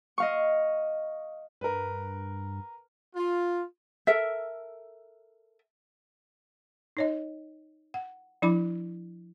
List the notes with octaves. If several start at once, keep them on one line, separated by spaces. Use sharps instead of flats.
D#5 F5 C#6
G2 A#4 B4
F4
A4 A#4 E5
D#4 C#5 D#5
F#5
F3 D4 E4 B5 D6